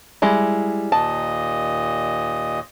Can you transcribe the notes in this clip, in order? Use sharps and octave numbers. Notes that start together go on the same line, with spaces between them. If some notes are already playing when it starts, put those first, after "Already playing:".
G3 G#3 E4
D#2 A#2 D#5 A5